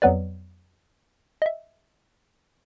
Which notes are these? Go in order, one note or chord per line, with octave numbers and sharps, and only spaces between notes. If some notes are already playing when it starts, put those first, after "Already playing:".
F2 F#3 B3 B4 D5
D#5 E5